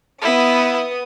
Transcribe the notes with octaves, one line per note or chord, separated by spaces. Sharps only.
B3 E4 D#6